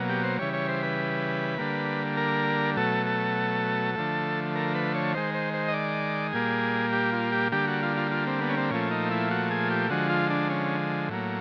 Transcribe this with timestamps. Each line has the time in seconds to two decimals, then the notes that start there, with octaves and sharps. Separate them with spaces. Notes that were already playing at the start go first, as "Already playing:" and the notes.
Already playing: B2 F#3 A#3
0.09 G4
0.23 C5
0.39 C#3 E3 G3 C#5
0.54 C#5
0.68 C5
0.83 B4
1.58 D3 G3 A#3
2.17 A#4
2.77 B2 F#3 A3 A4
3.06 A4
3.95 D3 F3 A3
4.55 A#4
4.75 B4
4.94 C#5
5.14 D#3 G#3 C5
5.34 C5
5.54 C5
5.68 D#5
5.74 D5
6.33 A#2 G3 A#3 G#4
6.93 G4
7.13 F4
7.32 G4
7.52 D3 G3 A#3 G4
7.67 F#4
7.83 F4
7.97 F4
8.11 F4
8.27 C4
8.41 B3
8.50 C#4
8.57 C4
8.71 A#2 F3 A3 C#4
8.91 D#4
9.11 E4
9.31 F#4
9.51 G#4
9.70 G4
9.90 D3 F3 G#3 F#4
10.10 F4
10.30 D4
10.50 C#4
11.09 A2 F#3 A#3